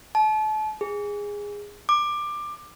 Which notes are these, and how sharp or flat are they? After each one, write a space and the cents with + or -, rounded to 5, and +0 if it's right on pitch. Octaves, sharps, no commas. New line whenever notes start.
A5 -35
G#4 -15
D6 +20